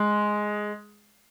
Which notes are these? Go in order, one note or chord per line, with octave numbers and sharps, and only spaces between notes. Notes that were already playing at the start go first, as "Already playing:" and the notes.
Already playing: G#3